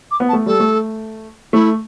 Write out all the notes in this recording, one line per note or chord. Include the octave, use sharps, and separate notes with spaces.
D6
B3
A5
A3
G3 A4
A3
A3 E4